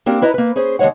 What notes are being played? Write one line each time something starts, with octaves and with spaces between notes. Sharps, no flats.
A#3 C4 D4 G4 A#4
E4 B4 D#5 A#5
A#3 B4
C#4 G#4 C5
D#2 F#3 G#3 C#5 F#5